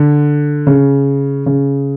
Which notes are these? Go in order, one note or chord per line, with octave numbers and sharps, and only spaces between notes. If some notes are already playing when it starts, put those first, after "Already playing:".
Already playing: D3
C#3
C#3